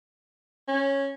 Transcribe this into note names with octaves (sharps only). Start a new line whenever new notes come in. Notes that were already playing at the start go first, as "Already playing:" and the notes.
C#4